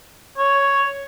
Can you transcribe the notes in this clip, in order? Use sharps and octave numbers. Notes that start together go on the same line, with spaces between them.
C#5